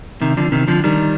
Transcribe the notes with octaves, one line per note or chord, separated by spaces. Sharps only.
C3 D#3
D3 F3
C3 D#3
D3 F3
D#3 G3